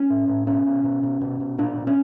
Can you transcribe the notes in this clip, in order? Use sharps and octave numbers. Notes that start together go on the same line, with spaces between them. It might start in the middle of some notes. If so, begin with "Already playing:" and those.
Already playing: C#4
A2
A2
B2 C#4
B2
B2
B2
B2
B2
A#2 D4
A#2
C#4